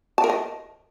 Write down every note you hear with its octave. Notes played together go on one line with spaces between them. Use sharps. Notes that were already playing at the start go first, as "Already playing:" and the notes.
A5
A#4
D#5